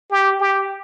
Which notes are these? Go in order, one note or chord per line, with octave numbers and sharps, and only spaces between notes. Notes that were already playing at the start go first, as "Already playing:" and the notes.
G4
G4